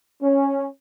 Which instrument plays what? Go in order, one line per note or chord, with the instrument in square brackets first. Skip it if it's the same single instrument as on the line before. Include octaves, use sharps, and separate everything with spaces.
[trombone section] C#4